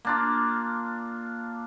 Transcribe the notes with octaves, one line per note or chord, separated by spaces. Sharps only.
A#3 D4 F4